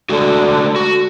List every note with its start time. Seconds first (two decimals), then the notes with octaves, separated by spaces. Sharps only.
0.09 D3 G#3 A3 F#4
0.76 F#4